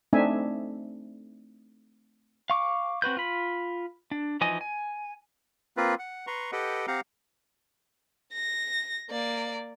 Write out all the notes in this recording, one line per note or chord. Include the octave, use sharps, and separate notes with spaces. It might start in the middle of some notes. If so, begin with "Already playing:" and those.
A3 C4 D4 D#4 E5 G#5
F5 C#6 D6
C4 F#4 B4 G6
F4 B5
D4
E3 F3 D#4 D#5 G#5
G#5
A#3 C4 F4 B4
F#5
B4 A#5 C6 C#6
G4 A4 B4 D#5 F#5 G5
C4 G4 F5 F#5 A#5
A#6
A#3 D5